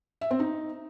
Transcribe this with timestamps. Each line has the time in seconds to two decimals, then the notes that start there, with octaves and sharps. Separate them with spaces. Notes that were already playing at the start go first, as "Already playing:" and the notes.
0.21 E5
0.31 C4
0.40 D#4